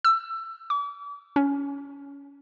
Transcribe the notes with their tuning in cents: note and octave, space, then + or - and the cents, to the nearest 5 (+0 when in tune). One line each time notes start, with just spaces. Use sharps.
E6 +20
D6 -40
C#4 +20